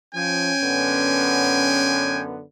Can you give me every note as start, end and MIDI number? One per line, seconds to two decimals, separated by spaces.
0.15 0.52 53
0.15 2.28 61
0.15 2.22 79
0.15 2.22 80
0.61 2.42 42
0.61 2.42 50
0.61 2.42 59